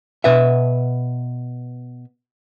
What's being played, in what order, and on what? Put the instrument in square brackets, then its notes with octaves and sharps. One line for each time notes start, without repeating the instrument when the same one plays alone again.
[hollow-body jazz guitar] B2 B4 E5